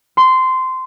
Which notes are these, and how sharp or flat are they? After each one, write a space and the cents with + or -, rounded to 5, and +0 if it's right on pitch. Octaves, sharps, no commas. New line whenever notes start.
C6 -15